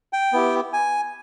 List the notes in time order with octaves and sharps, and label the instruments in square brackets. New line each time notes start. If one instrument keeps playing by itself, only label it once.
[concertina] G5
B3 E4 G4
G#5